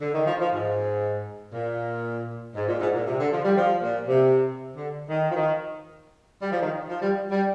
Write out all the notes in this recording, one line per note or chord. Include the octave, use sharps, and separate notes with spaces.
D3
D#3
F3
F3
G#2
A#2
G#2
A#2
G#2
A#2
C3
D3
F3
G3
F3
A#2
C3
D3
D#3
F3
D#3
G3
F3
D#3
F3
G3
G3